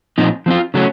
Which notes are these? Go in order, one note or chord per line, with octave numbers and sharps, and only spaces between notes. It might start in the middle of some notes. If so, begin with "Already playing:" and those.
A#2 F3 C4 D#4
F3 C4 F4
C#3 F#3 A3 C#4